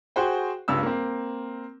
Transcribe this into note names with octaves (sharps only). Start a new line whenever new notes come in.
F#4 G#4 C5 G5
C#2 G2 G3 E6
A#3 C4